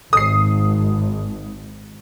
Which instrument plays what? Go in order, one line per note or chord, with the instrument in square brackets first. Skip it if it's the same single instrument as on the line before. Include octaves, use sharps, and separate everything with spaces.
[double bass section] G#1 [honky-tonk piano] D#6 C7